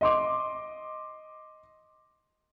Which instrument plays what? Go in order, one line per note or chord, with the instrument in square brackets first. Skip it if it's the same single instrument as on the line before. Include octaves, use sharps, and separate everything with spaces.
[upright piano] D#5 C6 D6